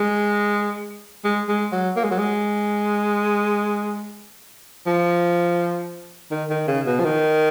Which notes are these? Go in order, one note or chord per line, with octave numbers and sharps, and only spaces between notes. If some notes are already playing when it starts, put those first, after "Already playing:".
Already playing: G#3
G#3
G#3
F#3
A#3
G#3
F#3
G#3
F3
D#3
D#3
C#3
B2
F3
D#3